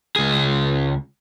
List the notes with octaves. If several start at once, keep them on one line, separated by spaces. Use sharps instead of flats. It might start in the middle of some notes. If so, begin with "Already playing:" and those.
C#2 G#4